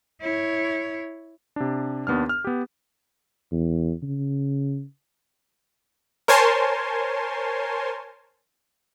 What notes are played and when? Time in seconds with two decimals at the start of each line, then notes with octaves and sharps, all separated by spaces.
0.21 E4 C#5
1.56 C3 D4
2.07 D#2 B3 D4 F6
2.29 F6
2.44 B3 G4
3.52 E2
4.02 C#3
6.28 A#4 C5 C#5 G#5 A5 C6